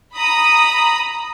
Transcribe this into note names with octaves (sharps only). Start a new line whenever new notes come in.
A#5 B5 D#6